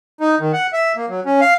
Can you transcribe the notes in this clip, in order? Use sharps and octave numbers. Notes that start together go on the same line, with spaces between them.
D#4
D#3
F#5
E5
A#3
F#3
C#4
F5